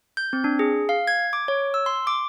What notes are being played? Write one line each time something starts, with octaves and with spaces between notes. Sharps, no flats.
G6
C4
D4
G#4
F5
G#6
D6
C#5
E6
C6
D6